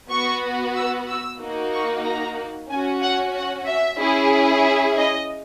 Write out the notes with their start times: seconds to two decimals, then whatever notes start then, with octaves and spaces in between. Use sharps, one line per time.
0.11 B3 F#4 C#6
0.76 E6
1.08 E6
1.41 A#3 D#4 F#4
1.73 C#6
2.05 A#5
2.70 C#4 F#4 G#5
3.03 F#5
3.35 F#5
3.67 E5
4.00 C#4 E4 G#4
4.65 E5
4.98 D#5